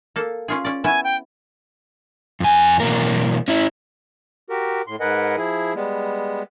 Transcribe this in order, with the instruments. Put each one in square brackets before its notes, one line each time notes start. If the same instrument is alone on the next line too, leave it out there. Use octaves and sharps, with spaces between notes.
[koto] A#3 A4
C#4 F4 G#4
C#4 D5
[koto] B3 C#4 E4 [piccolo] G#5
[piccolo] G5
[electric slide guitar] F2 G#5
B2 E3 F#3 A#3 A#4
C#4 E4
[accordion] F#4 G4 A#4
A2 C6
G#2 A#4 B4 D#5 F#5 G#5
F3 E4 G#4
G3 G#3 B3